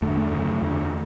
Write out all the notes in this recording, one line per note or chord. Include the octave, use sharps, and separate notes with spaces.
E2 D3 A3
A3
F#2 C#3
E2 D3